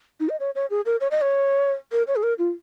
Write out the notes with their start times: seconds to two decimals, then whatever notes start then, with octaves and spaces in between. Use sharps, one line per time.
0.20 D#4
0.29 D#5
0.40 C#5
0.55 C#5
0.70 G#4
0.86 A#4
1.01 C#5
1.11 D#5
1.22 C#5
1.92 A#4
2.07 C#5
2.16 G#4
2.23 A#4
2.39 F4